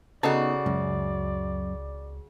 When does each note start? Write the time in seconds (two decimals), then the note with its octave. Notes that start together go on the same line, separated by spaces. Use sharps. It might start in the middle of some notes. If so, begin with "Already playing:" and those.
0.23 C#3 B3 D#4 F#4 A4 B4 D5 A5
0.66 C#2 F#2